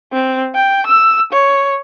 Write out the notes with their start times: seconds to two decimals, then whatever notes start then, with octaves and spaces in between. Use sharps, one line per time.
0.13 C4
0.55 G5
0.86 E6
1.33 C#5